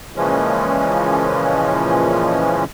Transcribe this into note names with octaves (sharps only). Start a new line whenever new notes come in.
A#2 C#3 E3 F3 G#3 C#4